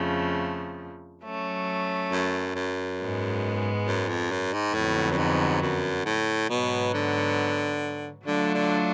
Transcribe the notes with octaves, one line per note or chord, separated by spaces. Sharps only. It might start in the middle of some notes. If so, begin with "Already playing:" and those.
Already playing: F2 C#3 F3 A3
F#3 A3 C#4
F#2
F#2
G#2 G#3 B3
F#2
F2
F#2
G#2
F2 A2 D3 F#3 B3 F#4
F#2
G#2
F#2
A2
G#2 B2 F#3 B3
D3
D3 F#3 A3 D4 F4
D3